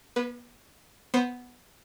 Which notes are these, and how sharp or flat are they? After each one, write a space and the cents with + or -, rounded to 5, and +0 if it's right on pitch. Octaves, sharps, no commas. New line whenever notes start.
B3 -40 B4 +0
B3 +0 C5 +0